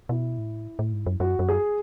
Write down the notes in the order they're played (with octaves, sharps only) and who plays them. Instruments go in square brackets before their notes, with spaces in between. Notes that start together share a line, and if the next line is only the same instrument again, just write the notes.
[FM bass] B2 [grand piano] E4
[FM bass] A2
A2
G#2
F#2
[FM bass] F#2 [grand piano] F#4
[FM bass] F#2
[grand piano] G#4